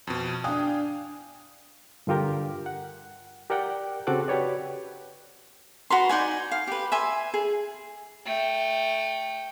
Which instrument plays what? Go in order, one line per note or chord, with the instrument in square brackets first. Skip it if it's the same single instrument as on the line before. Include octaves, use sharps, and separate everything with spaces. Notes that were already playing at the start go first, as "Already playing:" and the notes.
[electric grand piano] F2 B2
[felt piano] D4 D#6 [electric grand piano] F5 G5 G#5
[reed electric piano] G2 D3 F4 G4 A#4
F#5
G4 A#4 D5 F#5 G5
C#3 C4 F#4 A4 D6 F#6
F#4 G4 B4 C#5 D5
[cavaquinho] F#4 B4 A#5 C6
D#4 D5 F#5 G#5
F5
G4 B4
E5 G#5 C6
G#4
[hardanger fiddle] A3 G5